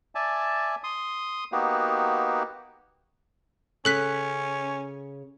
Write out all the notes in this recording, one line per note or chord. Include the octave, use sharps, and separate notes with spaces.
D5 E5 G#5 A5
C6 D#6
A#3 B3 D#4 F#4 G4
C#3 C#4 A4 F#6 B6